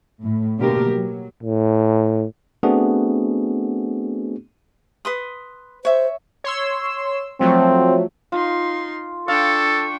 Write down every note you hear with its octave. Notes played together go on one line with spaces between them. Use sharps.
A2
B2 D3 A#3 G4 A#4
F#3
A2
A3 B3 C4 D4 F#4 G#4
B4 C6 D#6
C5 C#5 E5
C#5 C6 E6
F3 F#3 A3 C4
D#4 F4 C6
D4 A4 F5 G5 C#6